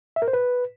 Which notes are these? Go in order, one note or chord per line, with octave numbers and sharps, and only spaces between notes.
E5
A#4
C5
B4